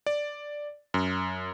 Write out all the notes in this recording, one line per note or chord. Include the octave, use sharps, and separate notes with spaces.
D5
F#2